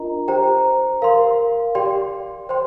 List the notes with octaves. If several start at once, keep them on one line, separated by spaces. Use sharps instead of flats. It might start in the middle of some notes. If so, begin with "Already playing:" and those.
Already playing: D4 F4 A#4 D#5 A#5
G4 C5 G5 A#5
A#4 F5 C6
G4 D5 G5 C6
C5 G5 C6